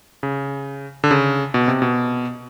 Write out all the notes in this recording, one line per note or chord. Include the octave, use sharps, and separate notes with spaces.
C#3
D3
C#3
B2
C3
B2